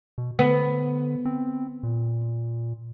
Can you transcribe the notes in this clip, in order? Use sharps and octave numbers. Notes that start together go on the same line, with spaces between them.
B2
D3 B3
C4
A#2